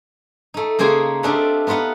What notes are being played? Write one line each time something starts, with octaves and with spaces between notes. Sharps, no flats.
A3 D#4
C#3 A#3 C#4 G#4 C5 G5
A3 C4 D4 F4 G4 D#5
B3 D#4 F4 B4 F#5